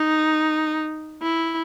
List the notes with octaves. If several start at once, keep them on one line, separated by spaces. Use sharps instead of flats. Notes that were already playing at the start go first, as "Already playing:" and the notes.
Already playing: D#4
E4